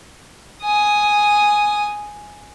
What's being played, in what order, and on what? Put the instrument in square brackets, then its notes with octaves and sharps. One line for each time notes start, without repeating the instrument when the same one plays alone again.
[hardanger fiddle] G#5 D#6